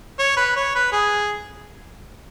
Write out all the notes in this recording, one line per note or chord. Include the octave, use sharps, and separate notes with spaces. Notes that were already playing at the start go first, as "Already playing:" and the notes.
C#5
B4
C#5
B4
G#4